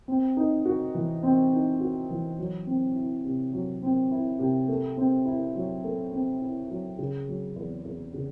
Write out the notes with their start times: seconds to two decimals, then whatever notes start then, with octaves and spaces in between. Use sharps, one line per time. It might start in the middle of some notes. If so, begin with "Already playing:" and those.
0.08 C4
0.37 D#4
0.65 F#4
0.94 E3
1.23 C4
1.52 D#4
1.80 F#4
2.10 E3
2.39 F#3
2.67 C4
2.95 E4
3.25 C3
3.53 F#3
3.82 C4
4.11 E4
4.39 C3
4.68 A3
4.97 C4
5.26 E4
5.55 F#3
5.84 A3
6.12 C4
6.42 E4
6.70 F#3
6.99 C#3
7.28 F#3
7.56 E2
7.85 E2
8.14 C#3